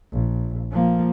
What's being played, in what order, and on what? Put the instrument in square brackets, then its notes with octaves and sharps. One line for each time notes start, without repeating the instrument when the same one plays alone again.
[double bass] A#1
F3 A#3